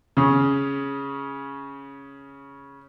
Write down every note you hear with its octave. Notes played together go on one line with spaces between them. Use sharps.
C#3 C#4